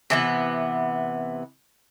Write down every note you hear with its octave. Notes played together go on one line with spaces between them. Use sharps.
C3 E3 B3